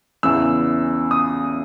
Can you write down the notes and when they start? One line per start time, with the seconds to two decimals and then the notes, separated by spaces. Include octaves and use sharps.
0.23 E2 C#3 E3 E6
1.11 D#6